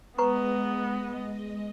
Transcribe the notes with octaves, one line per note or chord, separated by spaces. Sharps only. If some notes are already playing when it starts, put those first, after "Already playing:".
G#3 B3 B4 D#5 A#5 C#6